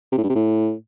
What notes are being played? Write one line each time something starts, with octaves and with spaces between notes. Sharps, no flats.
C3
A2
G2
C3
A2